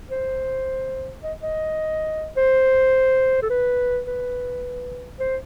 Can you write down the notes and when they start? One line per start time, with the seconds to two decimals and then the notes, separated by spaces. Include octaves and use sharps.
0.11 C5
1.24 D#5
1.43 D#5
2.37 C5
3.43 A4
3.50 B4
4.07 B4
5.20 C5